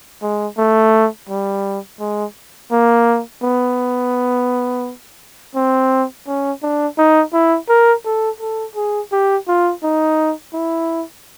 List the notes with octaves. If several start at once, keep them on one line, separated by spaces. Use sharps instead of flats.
G#3
A3
G3
G#3
A#3
B3
C4
C#4
D4
D#4
E4
A#4
A4
A4
G#4
G4
F4
D#4
E4